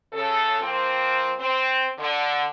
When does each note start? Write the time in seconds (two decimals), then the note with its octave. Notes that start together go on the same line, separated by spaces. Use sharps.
0.13 C#3 A4
0.60 F3 A#3 C4
1.39 C4
1.98 D3